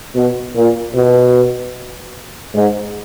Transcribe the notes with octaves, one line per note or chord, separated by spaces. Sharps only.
B2
A#2
B2
G#2